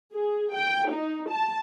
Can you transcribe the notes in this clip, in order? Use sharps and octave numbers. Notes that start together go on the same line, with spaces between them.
G#4
G5
D#4
A5